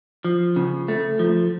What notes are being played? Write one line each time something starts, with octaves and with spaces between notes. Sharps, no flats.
F3
C#3
A3
F3